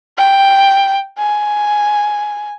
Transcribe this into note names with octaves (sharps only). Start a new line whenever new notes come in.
G5
G#5